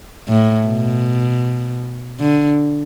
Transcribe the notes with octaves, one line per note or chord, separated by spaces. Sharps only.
A2
B2
D3